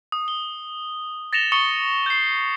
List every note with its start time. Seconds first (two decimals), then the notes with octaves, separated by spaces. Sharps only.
0.12 D#6
0.28 G7
1.33 A6 A#6 C#7 E7 F7 G7
1.52 C#6 D#6 C#7 G7
2.06 G6 C7